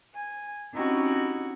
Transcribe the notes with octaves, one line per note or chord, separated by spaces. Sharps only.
G#5
C4 C#4 D#4 E4 F#4 G4